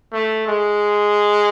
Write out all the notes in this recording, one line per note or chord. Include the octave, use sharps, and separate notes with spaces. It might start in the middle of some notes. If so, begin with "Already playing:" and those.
A3
G#3